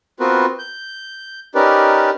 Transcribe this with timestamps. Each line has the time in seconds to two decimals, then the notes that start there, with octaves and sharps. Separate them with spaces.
0.20 B3 C4 F4 F#4 A#4 B4
0.59 G6
1.55 C#4 D#4 G4 A#4 B4 D5